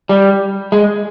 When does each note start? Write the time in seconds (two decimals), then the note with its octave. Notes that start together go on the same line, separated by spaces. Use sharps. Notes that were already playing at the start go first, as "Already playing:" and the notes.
0.09 G3
0.72 G#3